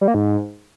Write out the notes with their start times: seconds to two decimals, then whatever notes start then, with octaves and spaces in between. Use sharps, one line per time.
0.01 G3
0.08 A#3
0.14 G#2